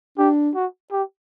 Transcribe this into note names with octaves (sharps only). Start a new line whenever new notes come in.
D4 G4
F#4
G4